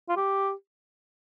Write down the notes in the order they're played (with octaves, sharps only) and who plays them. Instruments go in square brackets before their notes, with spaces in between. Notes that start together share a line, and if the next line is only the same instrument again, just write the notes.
[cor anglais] F4
G4